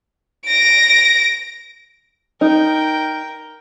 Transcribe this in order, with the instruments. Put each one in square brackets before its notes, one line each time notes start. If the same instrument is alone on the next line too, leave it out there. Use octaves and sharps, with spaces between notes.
[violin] A#6 D7
[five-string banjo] D#4 [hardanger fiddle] A#4 G5